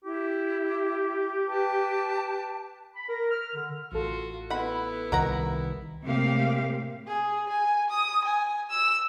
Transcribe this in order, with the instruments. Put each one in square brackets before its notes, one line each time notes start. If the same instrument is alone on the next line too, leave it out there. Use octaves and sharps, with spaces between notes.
[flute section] E4 [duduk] G4
[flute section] B4 G5 A5
[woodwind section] B5
A#4
F6
D3
[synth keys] A1 A4 [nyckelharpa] F4 F#4
[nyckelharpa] B3 E4 [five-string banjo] F#5 B5
[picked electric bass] C2 D#3 [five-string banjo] A#4 F#5 A#5
[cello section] A2 C3 G#3 A#3 G4 F5
[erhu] G#4
G#5
D#6
G#5
E6